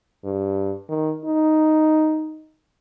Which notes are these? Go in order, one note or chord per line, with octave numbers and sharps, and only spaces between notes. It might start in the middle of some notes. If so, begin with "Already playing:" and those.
G2
D#3
D#4